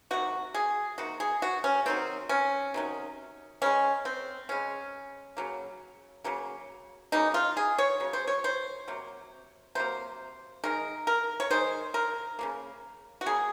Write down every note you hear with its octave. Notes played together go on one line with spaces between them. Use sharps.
C3 D#3 A#3 F#4
G#4
C3 D#3 A#3 F#4
G#4
F#4
C#4
C3 D#3 F#3 C4
C#4
C3 D#3 F#3
C#3 G#3 C#4
C4
C#3 G#3 C#4
C#3 F#3 A#3
C#3 F#3 A#3
C#3 F#3 A#3 D#4
F4
G#4
C#5
C#3 F#3
C5
C#5
C5
C3 F#3 A#3
C3 F#3 A#3 C5
D#3 G#3 A#4
A#4
C#5
D#3 G#3 C5
A#4
C#3 F#3 A#3
F#4
C#3 F#3 A#3 G#4